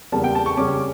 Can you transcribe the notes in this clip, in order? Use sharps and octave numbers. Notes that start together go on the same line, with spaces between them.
E2 C#3 G3 A#3 A5
G5
A5
C#6
C#3 G3 C#4 D6